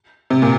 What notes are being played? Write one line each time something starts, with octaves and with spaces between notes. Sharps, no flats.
C3
A#2